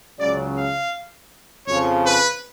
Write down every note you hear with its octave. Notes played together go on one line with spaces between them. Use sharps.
C#2 C#3 F#3 D5
F5
F2 C#3 F3 C#5
B4